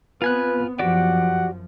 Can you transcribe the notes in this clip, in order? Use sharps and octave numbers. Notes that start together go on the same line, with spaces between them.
B3 C4 F4 B4 G#5 F#6
F#2 F3 F#4 G4 D5 F#5